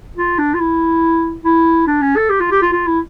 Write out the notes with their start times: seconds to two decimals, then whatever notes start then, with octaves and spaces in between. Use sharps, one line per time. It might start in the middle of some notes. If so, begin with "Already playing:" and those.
0.17 F4
0.39 D4
0.54 F4
0.60 E4
1.45 E4
1.87 D4
2.01 C#4
2.16 A4
2.30 G4
2.40 F4
2.51 G4
2.62 F4
2.72 F4
2.87 E4